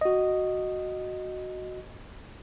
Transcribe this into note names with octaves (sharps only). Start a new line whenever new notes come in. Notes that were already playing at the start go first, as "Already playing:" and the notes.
F#4 D#5